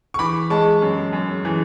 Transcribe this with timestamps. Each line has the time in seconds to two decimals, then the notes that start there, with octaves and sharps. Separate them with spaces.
0.14 C#6
0.19 E3 B5 D6
0.50 G#3 A5 C#6
0.82 F#2
1.13 F#2
1.45 E3